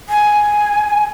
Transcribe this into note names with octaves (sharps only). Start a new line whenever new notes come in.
G#5